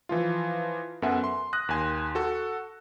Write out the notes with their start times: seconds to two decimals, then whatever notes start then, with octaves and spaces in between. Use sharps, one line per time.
0.09 E3 F3 F4
1.02 F#2 B3 A4 E5 F#5 G#5
1.24 C6
1.53 D#6 F#6 A#6
1.69 D#2 G#5 C6
2.15 F#4 A4